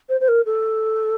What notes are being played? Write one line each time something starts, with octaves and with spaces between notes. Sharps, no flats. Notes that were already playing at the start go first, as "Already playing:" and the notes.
C5
C5
A#4
A4